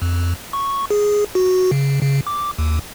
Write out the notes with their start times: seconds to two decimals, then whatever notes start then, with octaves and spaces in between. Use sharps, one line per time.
0.02 F2
0.53 C#6
0.90 G#4
1.35 F#4
1.72 C#3
2.01 C#3
2.27 D6
2.58 D#2